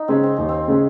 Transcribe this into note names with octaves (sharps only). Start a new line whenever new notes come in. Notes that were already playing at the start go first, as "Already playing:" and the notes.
Already playing: D#4
C#3 G#3 C4 C#4
C4
D#2 C#4
C4
C#3 G#3 C#4